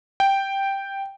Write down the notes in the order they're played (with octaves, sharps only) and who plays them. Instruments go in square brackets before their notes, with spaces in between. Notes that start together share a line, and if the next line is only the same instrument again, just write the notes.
[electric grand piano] G5